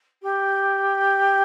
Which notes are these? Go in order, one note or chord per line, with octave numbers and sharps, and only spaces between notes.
G4